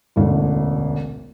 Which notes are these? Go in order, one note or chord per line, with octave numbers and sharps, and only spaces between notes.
E1 A1 D2